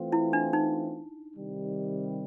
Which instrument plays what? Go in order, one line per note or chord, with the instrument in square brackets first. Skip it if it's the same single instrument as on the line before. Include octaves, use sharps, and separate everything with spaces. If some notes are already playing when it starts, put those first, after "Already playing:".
Already playing: [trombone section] E3 A3 C4 F4
[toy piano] E4
D4
D#4
[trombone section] C3 D#3 G3